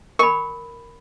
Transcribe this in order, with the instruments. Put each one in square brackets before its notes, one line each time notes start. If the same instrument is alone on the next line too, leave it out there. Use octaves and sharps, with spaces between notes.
[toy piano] A#4 B5 [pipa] G#5 C#6